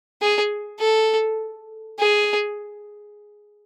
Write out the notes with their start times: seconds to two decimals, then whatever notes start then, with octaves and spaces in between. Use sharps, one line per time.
0.22 G#4
0.80 A4
2.00 G#4